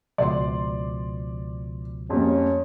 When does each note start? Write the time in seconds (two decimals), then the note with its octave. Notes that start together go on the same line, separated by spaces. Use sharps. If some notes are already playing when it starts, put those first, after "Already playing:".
0.18 C#2 B2 F3 D5 C6
2.10 F2 G3 A#3 C#4